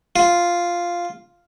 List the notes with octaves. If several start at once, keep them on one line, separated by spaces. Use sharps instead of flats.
F4